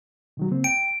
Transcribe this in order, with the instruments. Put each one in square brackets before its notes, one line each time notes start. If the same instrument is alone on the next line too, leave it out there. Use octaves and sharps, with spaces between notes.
[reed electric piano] B2 D#3 F#3
C#3 A#3 C4
[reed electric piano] G5 [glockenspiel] D7